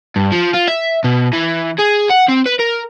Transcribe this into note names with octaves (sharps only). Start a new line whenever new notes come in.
G2
F3
F4
E5
B2
E3
G#4
F#5
C4
B4
A#4